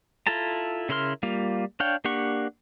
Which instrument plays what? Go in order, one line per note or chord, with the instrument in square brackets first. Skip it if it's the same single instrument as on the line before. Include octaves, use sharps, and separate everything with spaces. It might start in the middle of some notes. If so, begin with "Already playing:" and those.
[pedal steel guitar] E4 F4 A4 A5 A#5
C#3 E4 A#4 C6 F6
G3 A#3 F4
D4 C#5 F5 G5
A#3 D4 G4 F#5 C#6